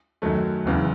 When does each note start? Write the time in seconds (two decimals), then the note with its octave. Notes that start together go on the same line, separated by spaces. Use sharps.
0.22 F#2 D#3 F#3 A3
0.65 F#1 E2 C#3